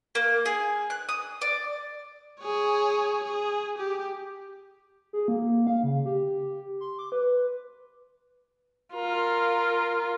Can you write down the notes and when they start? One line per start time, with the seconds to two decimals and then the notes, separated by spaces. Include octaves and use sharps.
0.15 A#3
0.46 G#4
0.90 F#6
1.09 D#6
1.41 D5
2.41 G#4 C#5
3.24 G#4
3.78 G4
5.13 G#4
5.28 A#3
5.67 F5
5.83 C#3
6.06 G4
6.81 C6
6.99 D6
7.12 B4
8.95 F4 A#4